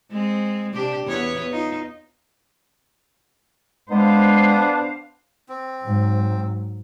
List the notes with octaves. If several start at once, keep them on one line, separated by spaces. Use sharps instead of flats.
G#3 C4
C3 D4 G4
E2 B3 C#5
D#4 F4
G#3 B3 D4 C5 F5
C4
G#2 F#3